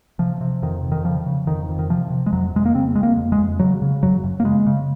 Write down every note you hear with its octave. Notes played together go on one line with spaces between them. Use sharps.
C3 F3
C3
F2 D#3
F2
D#3
C#3 F3
C#3
F2 D#3
F2
D#3
C3 F3
C3
G#3
F2 F#3
F2 G#3
A#3
C#3 C4
C#3 G#3
A#3
F2
G#3
F2
C#3 F#3
C#3
F#2 F#3
F#2
A#3
C#3 G#3
C#3